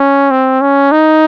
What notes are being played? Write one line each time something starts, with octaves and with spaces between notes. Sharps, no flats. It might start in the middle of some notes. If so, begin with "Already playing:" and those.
Already playing: C#4
C4
C#4
D#4